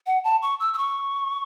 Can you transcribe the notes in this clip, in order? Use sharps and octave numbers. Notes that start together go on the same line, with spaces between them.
F#5
A5
C#6
E6
E6
C#6